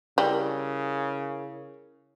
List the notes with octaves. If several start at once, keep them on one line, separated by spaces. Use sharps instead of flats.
C#3 G3 E4 A#4